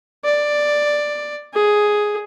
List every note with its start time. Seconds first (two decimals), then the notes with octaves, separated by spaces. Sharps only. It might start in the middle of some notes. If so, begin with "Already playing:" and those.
0.24 D5
1.53 G#4